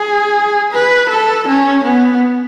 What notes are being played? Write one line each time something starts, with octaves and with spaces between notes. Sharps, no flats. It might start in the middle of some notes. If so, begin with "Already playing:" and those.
Already playing: G#4
B4
A4
C#4
B3